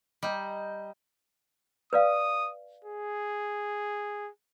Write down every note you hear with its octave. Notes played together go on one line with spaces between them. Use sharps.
G3 D#5 G5 A#5
B4 D5 F5 D#6
G#4